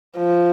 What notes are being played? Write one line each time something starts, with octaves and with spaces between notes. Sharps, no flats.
F3